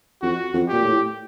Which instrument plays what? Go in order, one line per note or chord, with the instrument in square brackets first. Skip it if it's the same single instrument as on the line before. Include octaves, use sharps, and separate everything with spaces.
[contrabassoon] F2 [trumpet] F#4
[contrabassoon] F2
[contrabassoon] A#2 [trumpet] G4
[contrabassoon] A2